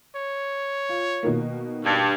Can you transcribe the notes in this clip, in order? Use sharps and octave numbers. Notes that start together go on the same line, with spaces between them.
C#5
F4
B2 D#3 A#3
G2